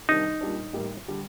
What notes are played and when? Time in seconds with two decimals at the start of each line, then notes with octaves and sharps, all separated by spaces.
0.09 C3 D#3 G3 D4 D#4
0.41 A#2 G3 D4
0.73 A1 A2 G3 A#3
1.08 D3 G3